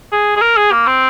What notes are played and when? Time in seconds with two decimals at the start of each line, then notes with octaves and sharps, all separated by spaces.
0.12 G#4
0.36 G#4
0.41 A#4
0.57 G#4
0.72 A#3
0.87 C4